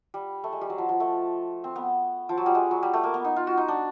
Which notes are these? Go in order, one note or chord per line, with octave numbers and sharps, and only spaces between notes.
G3
A3
G#3
G3
F#3
F3
F3
A3
C4
B3
F3
F#3
G3
G#3
F#3
G3
A3
A#3
B3
D#4
F4
F#4
D#4
D4